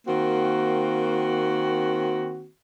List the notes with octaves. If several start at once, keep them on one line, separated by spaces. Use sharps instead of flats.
D#3 A#3 C4 F#4